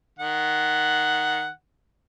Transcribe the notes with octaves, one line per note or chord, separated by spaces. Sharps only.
D#3 F#5